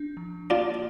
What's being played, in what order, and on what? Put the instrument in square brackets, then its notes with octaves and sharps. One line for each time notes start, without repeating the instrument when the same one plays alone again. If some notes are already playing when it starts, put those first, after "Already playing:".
Already playing: [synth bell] D4
F3
[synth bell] A#3 [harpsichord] D4 F4